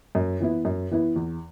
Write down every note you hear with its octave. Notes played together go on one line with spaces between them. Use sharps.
F#2
E3 B3 E4
F#2
E3 B3 E4
E2